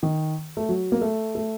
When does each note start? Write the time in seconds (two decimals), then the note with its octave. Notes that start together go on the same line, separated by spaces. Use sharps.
0.03 D#3
0.57 A3
0.69 F#3
0.92 A#3
1.02 A3
1.35 A3